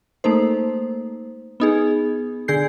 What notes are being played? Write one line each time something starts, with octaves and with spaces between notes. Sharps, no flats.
A3 A#3 D#4 C5
B3 D#4 G#4
D3 G#4 G6 C7